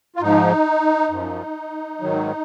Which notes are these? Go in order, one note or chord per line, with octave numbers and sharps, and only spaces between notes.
F4
G#2 F3 D#4
F#2 F3
G#2 D#3 F#3